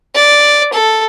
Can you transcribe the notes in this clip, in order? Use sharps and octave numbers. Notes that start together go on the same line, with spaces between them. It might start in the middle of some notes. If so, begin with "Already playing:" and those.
D5
A4